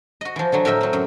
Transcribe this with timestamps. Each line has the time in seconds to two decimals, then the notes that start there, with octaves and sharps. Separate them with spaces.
0.21 F#4 D#5
0.36 E3 F3
0.52 D3 F3 F#3
0.65 A2 A#4 D#5 E5 G5
0.81 F#3 C4
0.93 F#2